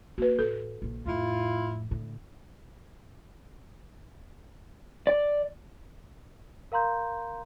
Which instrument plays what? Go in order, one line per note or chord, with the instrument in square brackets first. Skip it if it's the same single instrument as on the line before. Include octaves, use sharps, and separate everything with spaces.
[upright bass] A#3 [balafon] F#4 B4
[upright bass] A2 [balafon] A4
[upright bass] A#1 D#3
[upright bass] F2 A2 [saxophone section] E4 F4
[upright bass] A2 D3
[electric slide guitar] D5
[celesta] A#4 F5 A#5 C6 G6